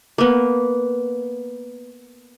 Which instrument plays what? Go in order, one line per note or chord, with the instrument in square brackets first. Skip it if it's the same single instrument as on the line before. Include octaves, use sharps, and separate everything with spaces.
[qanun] A#3 B3